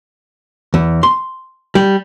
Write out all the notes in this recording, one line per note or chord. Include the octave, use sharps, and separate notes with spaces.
E2
C6
G3